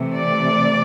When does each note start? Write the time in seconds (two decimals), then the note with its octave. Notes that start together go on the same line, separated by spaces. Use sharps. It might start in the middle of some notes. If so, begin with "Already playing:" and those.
Already playing: C3 E3 A3
0.16 D5